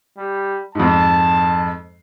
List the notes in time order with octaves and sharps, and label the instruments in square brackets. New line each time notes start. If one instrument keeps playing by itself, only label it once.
[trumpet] G3
[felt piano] F2 G#2 [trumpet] A5